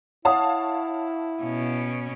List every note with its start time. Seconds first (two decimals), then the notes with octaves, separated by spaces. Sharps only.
0.25 E4 C#5 F5 F#5 A5 D#6
1.43 B2 C#4